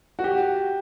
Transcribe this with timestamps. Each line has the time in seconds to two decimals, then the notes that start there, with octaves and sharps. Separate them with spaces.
0.19 F#4
0.24 G4